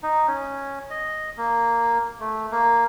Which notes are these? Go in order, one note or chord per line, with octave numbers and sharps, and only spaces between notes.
D#4
C#4
D#5
A#3
A3
A#3